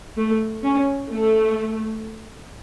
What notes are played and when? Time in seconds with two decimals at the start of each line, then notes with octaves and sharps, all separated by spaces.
0.17 A3
0.64 C#4
1.10 A3